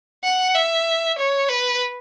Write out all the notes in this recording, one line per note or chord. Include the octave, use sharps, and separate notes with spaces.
F#5
E5
C#5
B4